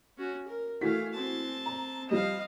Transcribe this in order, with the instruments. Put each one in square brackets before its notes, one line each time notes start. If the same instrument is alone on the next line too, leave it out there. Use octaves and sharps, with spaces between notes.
[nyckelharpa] C#4 F#4
A#4
[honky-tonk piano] E3 F#4 B6 [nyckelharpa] A3 F5
[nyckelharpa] C4 A5
[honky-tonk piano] A#5
[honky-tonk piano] F3 G3 E7 [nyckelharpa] D#5 F5